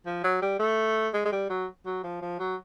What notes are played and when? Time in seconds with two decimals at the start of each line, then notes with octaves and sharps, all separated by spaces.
0.06 F3
0.24 F#3
0.42 G3
0.59 A3
1.13 G#3
1.25 G#3
1.32 G3
1.50 F#3
1.86 F#3
2.03 F3
2.22 F3
2.39 F#3